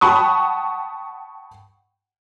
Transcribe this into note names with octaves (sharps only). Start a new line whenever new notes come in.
F#5 G5 A5 B5 C#6 D#6